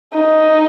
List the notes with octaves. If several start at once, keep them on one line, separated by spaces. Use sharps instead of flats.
D#4